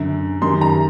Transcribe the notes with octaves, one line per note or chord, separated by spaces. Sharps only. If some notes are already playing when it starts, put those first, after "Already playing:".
Already playing: F#2 D3
F#2 D#3 C6
A#5